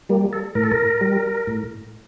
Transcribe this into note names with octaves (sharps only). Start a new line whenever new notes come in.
G3 A#3
A4
A2 A#4
A4
A#4
G3
A2